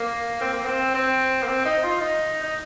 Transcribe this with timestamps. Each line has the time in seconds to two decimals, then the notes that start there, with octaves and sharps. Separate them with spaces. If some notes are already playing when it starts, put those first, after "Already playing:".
Already playing: A#3
0.41 C4
0.53 A#3
0.64 C4
0.95 C4
1.43 A#3
1.48 C4
1.65 D#4
1.83 F4
2.01 D#4
2.43 D#4